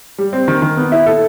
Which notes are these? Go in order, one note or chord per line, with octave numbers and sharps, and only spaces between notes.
G3
C4
D#3
D#3
B3
E4
A4